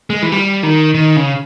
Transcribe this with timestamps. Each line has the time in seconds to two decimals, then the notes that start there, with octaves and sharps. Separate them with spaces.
0.10 G#3
0.22 E3
0.32 G3
0.63 D#3
0.95 D#3
1.16 C#3